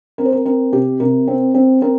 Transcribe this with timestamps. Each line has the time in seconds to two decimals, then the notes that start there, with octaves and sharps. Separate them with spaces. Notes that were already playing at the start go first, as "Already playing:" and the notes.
0.18 C4 A#4
0.25 C5
0.32 A#4
0.45 C4 A#4
0.72 C3 G4
1.00 C3 A#4
1.28 C4
1.54 C4
1.82 C4 A#4